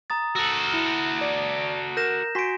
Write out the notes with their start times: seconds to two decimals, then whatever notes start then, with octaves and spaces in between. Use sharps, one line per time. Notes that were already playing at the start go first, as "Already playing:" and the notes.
0.10 A#5 D#6 A6
0.36 F#4 A4 E6
0.74 E4
1.21 D5
1.97 A#4 G6 A#6 E7
2.35 F#4 G#5 C6 B6 D7